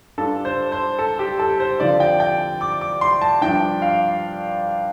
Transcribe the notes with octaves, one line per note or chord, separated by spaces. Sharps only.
G2 G3 D4 F4 A4
C5
C5
A4
G4
A4
C5
D3 F3 C4 F4 D5
G5
G5
D6
D6
C6
A5
G2 F3 D4 G5
F5